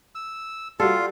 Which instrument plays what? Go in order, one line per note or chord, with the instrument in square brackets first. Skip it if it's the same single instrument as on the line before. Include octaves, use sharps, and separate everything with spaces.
[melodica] E6
[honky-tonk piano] G3 F#4 [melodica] F4 [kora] A4